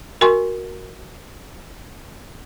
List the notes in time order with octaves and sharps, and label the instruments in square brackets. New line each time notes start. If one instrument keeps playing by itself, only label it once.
[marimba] F#4 A#4 G#5 C6 C#6